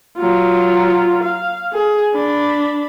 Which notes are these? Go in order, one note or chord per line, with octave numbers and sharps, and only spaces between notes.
F#3 F4
F5
G#4
D4 B5